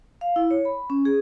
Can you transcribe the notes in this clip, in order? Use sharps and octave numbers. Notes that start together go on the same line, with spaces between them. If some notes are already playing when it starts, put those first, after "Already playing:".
F5
E4
C#5
B5
C#4
G#4